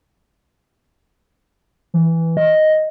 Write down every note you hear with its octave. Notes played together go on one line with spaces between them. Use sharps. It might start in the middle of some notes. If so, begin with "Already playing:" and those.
E3
D#5